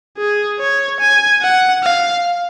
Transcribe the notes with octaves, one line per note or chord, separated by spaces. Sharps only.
G#4
C#5
G#5
F#5
F5